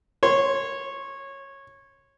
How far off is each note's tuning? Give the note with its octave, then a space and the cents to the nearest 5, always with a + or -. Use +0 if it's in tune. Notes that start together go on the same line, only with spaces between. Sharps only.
C#5 -15 C6 -10